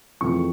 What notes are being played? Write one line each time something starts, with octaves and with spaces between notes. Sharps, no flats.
F2 C#3 E3 A3 C#6